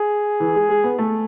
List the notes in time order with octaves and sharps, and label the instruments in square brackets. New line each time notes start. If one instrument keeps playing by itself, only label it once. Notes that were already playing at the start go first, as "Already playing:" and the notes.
Already playing: [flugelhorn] G#4
[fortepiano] E3
G#3
G#3
B3
A3